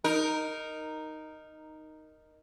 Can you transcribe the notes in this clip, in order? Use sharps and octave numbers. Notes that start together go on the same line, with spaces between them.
D#4 A#4